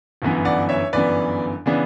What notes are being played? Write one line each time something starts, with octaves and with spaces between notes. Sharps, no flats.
G1 F#2 E3 B3
D5 F#5
C#5 E5
G1 F#2 E3 B3 B4 D5
C#3 E3 B3 D4